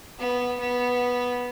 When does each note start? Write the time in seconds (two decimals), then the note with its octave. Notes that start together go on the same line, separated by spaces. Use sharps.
0.19 B3
0.60 B3